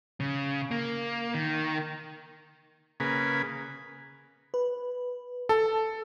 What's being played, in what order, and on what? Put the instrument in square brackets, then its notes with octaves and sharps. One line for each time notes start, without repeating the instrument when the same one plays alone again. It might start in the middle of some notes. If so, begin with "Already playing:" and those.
[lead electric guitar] C#3
A#3
D#3
[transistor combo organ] C#3 A#3 G#4 B4
[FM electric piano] B4
[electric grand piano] A4 [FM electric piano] A5